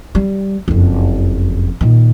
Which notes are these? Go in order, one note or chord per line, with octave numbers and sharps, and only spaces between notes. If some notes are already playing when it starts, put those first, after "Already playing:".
G3
F#1 F2
A#2 D#3